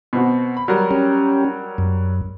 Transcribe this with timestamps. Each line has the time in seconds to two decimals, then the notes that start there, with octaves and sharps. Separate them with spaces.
0.13 B2 C4 F#4
0.57 B5
0.68 F#3 G3 A#4
0.91 C#4 G4
1.78 F#2